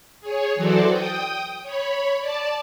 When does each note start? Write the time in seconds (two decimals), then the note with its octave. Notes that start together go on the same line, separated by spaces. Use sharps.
0.21 G#4 C#5
0.56 E3 F#3 F#4 A4 C5 D5
0.88 G5 D#6
1.63 C#5 B5
2.20 D5 A5